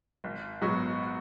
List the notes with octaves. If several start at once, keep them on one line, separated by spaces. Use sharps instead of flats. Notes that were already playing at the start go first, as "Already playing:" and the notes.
G#1
G#2 F#3 B3 F#4